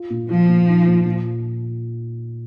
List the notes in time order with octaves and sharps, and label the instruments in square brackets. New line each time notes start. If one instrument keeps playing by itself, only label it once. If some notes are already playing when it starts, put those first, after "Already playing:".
Already playing: [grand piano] F4
A#2
[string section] F3 [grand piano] F4
[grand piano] A#2
D#4
A#2
A#2